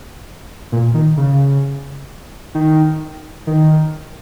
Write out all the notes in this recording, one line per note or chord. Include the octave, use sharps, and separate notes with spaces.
A#2
D#3
C#3
D#3
D#3